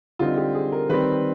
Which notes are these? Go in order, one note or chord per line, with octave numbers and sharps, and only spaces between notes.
D3 G3 C4 D#4 F4
G4
G#4
A#4
D#3 G3 C4 B4